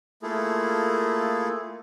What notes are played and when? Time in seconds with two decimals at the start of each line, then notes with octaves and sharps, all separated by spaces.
0.22 A3 A#3 E4 F4 G#4 A4